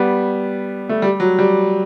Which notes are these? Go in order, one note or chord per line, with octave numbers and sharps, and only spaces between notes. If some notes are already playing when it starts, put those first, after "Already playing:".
Already playing: G3 B3
A3
G3
F#3
G3